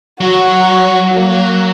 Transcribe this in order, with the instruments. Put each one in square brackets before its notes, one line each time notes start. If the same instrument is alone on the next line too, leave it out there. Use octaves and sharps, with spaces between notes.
[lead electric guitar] F#3 [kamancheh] F#4
[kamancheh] A#3